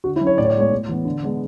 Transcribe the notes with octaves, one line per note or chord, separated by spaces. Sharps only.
D3 F#4
E4
F#3 C#4
C#5
A2 D5
C#5
D5
G#3 B3 C#5
A2
E3 B3
D3
G#3 B3 D4